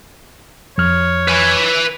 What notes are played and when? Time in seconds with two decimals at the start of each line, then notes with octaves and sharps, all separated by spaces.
0.78 F2 C#5 F6
1.28 B4 G#5